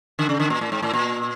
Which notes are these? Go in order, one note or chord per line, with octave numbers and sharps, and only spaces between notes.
D3
C#3
D3
A#2
A2
G#2
A2
A#2